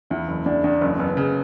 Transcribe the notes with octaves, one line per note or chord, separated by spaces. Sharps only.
E2 E4
F#1
E2 D4
E2 D4
F#1 C#4
F#1 B3
C#3